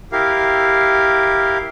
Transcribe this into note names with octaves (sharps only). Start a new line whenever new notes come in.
E4 G4 A#4 F5